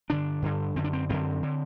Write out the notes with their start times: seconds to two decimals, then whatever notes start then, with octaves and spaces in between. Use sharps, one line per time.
0.10 G2 D3 D4
0.42 G2 D3
0.76 F#2 D3 C4
0.84 D4
0.93 C4
1.09 F#2 D3 C4
1.43 D3